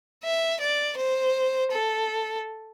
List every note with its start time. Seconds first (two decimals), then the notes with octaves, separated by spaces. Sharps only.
0.24 E5
0.61 D5
0.97 C5
1.71 A4